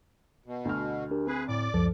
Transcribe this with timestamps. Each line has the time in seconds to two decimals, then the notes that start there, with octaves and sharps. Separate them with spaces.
0.46 B2
0.65 D2 F6
1.11 D4 G4 A#4
1.27 C4 G#4 B4
1.48 A2 D5 D6
1.74 C#2 F#2 F3 A4